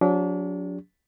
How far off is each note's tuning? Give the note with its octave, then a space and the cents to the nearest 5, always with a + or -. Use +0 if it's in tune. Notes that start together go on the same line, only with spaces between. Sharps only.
F#3 -30 D4 -35 G4 +40